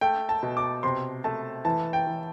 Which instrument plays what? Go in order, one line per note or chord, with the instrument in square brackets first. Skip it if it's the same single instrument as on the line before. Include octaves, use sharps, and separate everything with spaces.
[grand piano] A3 G5
A5
B2
D6
C3 C6
A3 A5
E3 A5
G5
E3